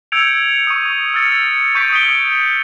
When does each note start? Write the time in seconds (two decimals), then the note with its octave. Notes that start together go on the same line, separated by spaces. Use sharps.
0.12 E6 G6 G#6 C#7 D7 F7
0.67 C#6 D#6
1.14 E6 F6 A6 C#7
1.75 C#6 G6 B6 D7
1.92 D#6 C#7 D7 G7